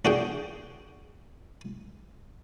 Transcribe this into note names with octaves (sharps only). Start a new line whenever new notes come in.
D4 F#4 G#4 G5